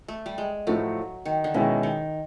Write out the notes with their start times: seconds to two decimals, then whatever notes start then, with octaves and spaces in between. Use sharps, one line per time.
0.08 A3
0.26 G3
0.38 G#3
0.67 A2 F3 F#3 A3
1.25 D#3
1.44 D3
1.54 B2 D#3 G#3 C#4 E4
1.83 D#3